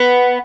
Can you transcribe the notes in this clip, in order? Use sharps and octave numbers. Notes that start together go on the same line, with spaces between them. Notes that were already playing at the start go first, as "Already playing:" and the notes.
Already playing: B3